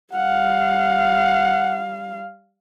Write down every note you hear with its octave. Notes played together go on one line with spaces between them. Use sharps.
G3 F5 F#5